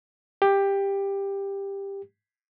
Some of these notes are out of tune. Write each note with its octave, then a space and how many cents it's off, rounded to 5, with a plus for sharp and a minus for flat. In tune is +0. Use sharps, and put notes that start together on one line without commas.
G4 +15